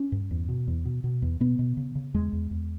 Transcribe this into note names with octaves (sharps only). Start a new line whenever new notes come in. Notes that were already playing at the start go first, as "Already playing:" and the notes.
Already playing: C#4
G2
E2
B2
E2
B2
B2
E2
B2 B3
B2
C#3
C#3
E2 G#3
E2
E2